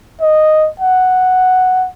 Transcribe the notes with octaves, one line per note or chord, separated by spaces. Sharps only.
D#5
F#5